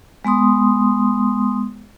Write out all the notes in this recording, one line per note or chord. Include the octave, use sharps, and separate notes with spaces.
G#3 B3 C6 D#6